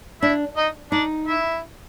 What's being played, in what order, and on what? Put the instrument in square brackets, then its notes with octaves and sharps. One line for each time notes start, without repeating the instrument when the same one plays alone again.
[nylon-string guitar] D4 [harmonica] E4 E5
[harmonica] D#4 D#5
[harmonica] D4 D5 [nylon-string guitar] D#4
[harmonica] E4 E5